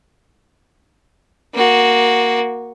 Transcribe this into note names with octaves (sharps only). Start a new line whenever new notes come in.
A#3 F#4